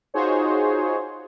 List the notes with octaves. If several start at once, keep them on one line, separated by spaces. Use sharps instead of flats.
D#4 F4 F#4 G#4 C5 C#5